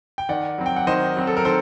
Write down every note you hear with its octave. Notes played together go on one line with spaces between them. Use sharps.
G5
D#3 D5 F#5
F#3 C4
G5
F#5
D#3 C5 D#5
F#3 C4
A4
A#4
D#3 A4 C5